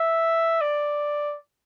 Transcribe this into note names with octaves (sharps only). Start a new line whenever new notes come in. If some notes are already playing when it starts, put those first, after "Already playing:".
Already playing: E5
D5